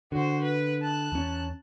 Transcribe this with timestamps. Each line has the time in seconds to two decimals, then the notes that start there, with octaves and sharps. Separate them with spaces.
0.12 D3 F#4 C5
0.41 B4
0.82 A5 F#6
1.12 E2 C#4